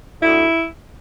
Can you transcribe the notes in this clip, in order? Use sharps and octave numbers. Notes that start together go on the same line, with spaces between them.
D2 D3 E4